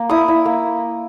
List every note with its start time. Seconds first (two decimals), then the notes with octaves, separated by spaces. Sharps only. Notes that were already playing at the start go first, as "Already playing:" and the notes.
Already playing: A#3
0.10 E4 D#6
0.28 E4
0.45 A#3